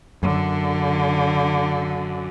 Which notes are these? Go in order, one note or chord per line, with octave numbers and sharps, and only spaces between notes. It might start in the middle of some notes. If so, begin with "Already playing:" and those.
F#2 D3